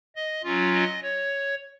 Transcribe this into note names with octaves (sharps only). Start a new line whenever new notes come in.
D#5
F#3 C#4 F4
D#5
C#5